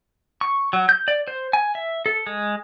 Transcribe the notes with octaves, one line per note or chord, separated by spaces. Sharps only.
C#6
F#3
G6
D5
C5
G#5
E5
A4
G#3